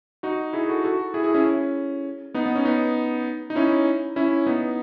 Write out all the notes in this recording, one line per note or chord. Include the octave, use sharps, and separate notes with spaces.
D#4 F#4
E4 G#4
F#4 A4
F#4 A4
E4 G#4
E4 G#4
C#4 E4
C#4
B3 D#4
B3
C#4
B3 D#4
D#4
C#4 E4
C#4 E4
B3 D#4